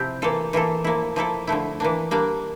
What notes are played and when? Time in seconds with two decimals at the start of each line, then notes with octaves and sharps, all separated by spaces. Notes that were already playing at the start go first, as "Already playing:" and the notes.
Already playing: C3 F3 C4 E4 G4
0.22 E3 A#3 F4 A4
0.53 E3 A#3 F4 A4
0.84 F3 A#3 E4
1.16 F3 A#3 E4 A4
1.47 D3 F3 A3 E4
1.80 E3 A#3 D4
2.11 G3 A#3 D4